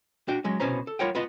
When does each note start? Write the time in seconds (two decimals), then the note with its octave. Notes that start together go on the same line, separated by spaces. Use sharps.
0.28 D4 F#4 G5
0.44 F#3 G#3 C#4
0.60 C2 B2 C#4 B4 C5 A#5
0.87 A4
0.99 G3 F4 A#4 C#5 F#5 G5
1.15 B3 F4 B4 D#5 B5